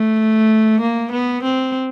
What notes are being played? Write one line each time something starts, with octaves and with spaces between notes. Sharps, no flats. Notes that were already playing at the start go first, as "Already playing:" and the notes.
Already playing: A3
A#3
B3
C4